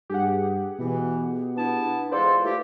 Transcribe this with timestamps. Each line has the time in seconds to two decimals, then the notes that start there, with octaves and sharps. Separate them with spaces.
0.10 G2 G4 G#4 F#5
0.79 B2 E3
1.56 B3 D4 E4 A5
2.11 E2 G#3 F4 A4 B4 C5 D5 C6
2.44 A3 A#3 E4 G4